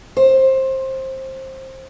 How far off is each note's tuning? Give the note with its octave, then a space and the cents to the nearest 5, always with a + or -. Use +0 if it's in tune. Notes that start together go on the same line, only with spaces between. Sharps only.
C5 +20